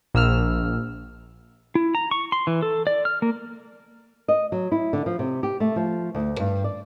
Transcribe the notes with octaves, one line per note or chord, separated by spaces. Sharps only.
A#1 E6 F6
E4
A#5
C#6
C6
E3
A4
D5
F6
A#3
D#5
F#3
E4
D3
F3
C3
G4
A3
F3
D2
G2
D5